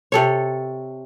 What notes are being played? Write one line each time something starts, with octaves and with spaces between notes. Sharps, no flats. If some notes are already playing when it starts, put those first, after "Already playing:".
C3 A4 C#5